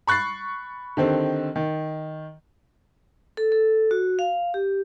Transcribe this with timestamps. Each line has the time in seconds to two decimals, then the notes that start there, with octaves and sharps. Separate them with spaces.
0.07 B5 C#6 F#6 A6 C7
0.97 D3 D#3 C4 G4
1.56 D#3
3.37 A4
3.52 A4
3.91 F#4
4.19 F5
4.54 G4